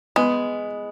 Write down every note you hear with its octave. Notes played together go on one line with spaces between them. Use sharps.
G#3 B3